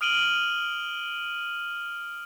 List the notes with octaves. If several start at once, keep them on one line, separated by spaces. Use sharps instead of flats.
D#6 F6 D7 D#7 F#7 G7